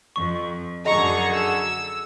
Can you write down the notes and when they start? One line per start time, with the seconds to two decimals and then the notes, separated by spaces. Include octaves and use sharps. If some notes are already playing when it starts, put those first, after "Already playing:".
0.16 F2 C#6
0.86 F#2 D3 F#4 G#4 D#5 A#5 C#6
1.33 E6